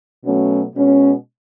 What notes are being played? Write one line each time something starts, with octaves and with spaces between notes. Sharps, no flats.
B2 F#3 A3 C#4
B2 G#3 C#4